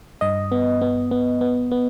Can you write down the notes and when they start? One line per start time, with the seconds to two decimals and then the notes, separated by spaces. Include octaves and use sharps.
0.21 G2 D#5
0.52 B3
0.81 B3
1.11 B3
1.41 B3
1.71 B3